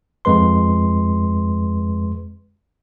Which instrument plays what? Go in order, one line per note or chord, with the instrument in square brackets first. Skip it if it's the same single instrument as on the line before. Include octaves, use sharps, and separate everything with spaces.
[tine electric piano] F2 G#3 B4 C6